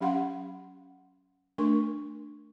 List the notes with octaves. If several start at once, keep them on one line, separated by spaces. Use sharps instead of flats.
F#3 C#4 G4 F5 F#5 C6
A3 D4 A#4 C6 C#6